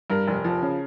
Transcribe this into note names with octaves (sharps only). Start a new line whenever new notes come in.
G2 A#4
F1
F3
C#3